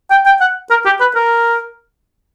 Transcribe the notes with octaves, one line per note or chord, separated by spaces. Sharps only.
G5
G5
F#5
A#4
G4
B4
A#4